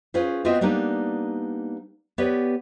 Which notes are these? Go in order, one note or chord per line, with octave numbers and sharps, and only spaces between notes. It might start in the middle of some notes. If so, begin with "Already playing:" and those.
C#4 F4 G#4 B4 C5
B3 C4 F4 F#4 D#5 E5
G3 A#3 B3 D4 D#4
B3 G4 B4 C#5 D5